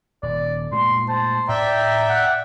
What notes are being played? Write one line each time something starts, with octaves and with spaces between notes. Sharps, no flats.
D#1 D5
A#2 G#3 A3 C6
C5 A5
A2 D5 E5 G5 A#5
F#5